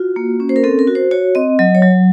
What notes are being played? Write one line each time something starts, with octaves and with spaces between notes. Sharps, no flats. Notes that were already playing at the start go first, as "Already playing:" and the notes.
Already playing: F4 F#4
A#3
C#4
C5
A#4
C4 A4
A#4
F#4
C5
F#4 C#5
C4 D#5
F#3 D#5
C#5
F#3